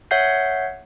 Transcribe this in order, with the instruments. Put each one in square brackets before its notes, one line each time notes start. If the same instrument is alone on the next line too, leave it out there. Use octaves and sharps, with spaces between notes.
[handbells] C#5 E5 F#5 G6 C7